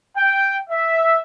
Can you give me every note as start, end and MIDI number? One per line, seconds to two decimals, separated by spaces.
0.16 0.56 79
0.70 1.20 76